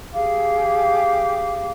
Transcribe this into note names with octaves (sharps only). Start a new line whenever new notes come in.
G4 G#4 F5 D6